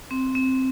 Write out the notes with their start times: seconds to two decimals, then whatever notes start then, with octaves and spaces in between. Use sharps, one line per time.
0.11 C4
0.35 C4